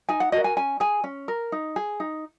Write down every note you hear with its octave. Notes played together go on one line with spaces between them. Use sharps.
D#4 G#5
F#5
F#4 A#4 D#5
G#5
C#4 G#5
G#4 G#5
C#4
A#4
D#4
G#4
D#4